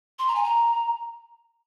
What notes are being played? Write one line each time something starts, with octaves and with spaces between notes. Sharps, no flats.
C6
A#5
G#5
A#5